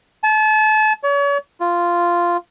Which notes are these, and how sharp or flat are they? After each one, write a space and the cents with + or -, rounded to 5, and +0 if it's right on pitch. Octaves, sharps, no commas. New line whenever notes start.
A5 -35
C#5 +40
F4 -5